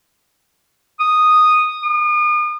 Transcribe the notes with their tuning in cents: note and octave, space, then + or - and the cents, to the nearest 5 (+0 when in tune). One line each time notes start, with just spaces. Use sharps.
D#6 -5
D#6 -45